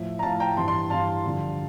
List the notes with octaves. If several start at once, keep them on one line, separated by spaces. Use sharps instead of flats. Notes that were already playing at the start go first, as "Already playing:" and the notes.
Already playing: A2 F3 E5
A#5
A2 F3 F5 A5
G5 A#5
G2 E3 A5 C6
A5 C6
G2 E3 F5 A5
G2 D3 F3